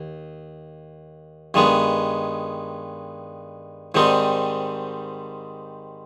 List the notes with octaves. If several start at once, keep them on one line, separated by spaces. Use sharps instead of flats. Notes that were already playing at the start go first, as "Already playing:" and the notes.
Already playing: D#2
G2 D#3 G#3 B3
G#2 D#3 G3 C4 D#4